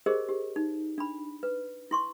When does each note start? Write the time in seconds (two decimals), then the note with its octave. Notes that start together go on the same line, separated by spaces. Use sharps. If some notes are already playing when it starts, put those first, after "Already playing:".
0.06 G4 G#4 A#4 C5 D#5
0.29 G4
0.56 D#4
0.98 D4 B5
1.43 B4
1.91 E4 C6 C#6